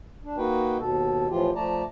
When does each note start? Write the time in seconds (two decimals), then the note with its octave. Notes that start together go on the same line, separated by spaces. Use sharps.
0.24 D4
0.38 A#3 D#4 F#4 B4 G5
0.79 D#2 B2 A4
1.30 A2 E3 F3 F4 G4
1.55 F3 A3 D5 A5 A#5